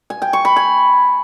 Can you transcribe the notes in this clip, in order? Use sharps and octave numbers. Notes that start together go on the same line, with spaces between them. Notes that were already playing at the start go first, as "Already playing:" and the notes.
G#5
G5
C#6
B5
G#5